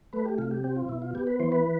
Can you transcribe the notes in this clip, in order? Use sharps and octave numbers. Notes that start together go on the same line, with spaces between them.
A3 B4
G4
C3 F4
G4
C4 G4
F4
B2 E4
F4
B3 G4
B4
E3 C5
B4